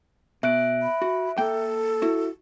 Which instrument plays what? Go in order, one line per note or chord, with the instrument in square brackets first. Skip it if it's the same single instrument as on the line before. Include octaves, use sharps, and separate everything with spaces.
[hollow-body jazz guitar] B2 [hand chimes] E5 F#6 D7
[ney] B5
[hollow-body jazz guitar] F#4
[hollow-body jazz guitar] A#3 G5 [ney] A4
[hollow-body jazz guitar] E4 F#4